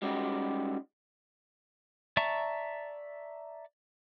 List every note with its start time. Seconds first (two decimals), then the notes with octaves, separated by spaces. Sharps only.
0.02 G3 G#3 C#4 D#4 F#4 G4
2.17 D5 E5 A5 A#5 C#6